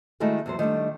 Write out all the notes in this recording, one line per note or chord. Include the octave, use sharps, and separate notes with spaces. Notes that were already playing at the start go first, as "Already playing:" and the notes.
D#3 G#3 A3 E4 F#4 A4
E2 F#3 C5
D#3 G3 A3 D4